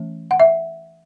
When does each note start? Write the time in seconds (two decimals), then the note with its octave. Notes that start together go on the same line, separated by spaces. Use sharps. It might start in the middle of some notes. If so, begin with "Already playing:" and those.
Already playing: E3 A3 C#4
0.31 F#5
0.40 E5